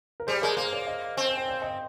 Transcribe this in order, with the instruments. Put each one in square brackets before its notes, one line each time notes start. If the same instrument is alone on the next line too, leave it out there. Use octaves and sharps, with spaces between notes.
[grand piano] A#4
[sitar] G3 [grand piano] G#4 C5
[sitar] G#3 [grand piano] A#4 D5
[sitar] A#3 [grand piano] G#4 C5
[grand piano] A#4 D5
C5 D#5
[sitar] C4
[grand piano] G#5
G5
D5 F5
D#5 G5